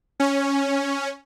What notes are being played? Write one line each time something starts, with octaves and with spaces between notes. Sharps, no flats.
C#4